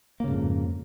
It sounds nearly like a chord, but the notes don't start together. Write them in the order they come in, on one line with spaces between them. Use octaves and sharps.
A#3 C#3 G#2 F2